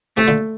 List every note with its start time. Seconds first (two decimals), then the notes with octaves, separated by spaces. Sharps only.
0.17 A2 C3 A3
0.28 A#2 D3